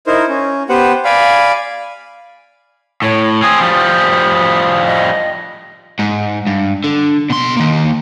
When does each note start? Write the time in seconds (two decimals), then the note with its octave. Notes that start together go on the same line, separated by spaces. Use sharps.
0.07 D#4 E4 A#4 C5
0.28 C#4
0.69 B3 G4 B4 C5 F#5
1.05 D5 F5 G#5 B5
3.02 A2 C#5
3.43 C4 G#4 D#6
3.61 F3 G3 D#6
4.85 D#5
5.99 G#2
6.47 G2
6.84 D3
7.30 B2 C6
7.57 D#3 A#3